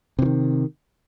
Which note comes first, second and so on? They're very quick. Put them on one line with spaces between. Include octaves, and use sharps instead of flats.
C3 E3 D#3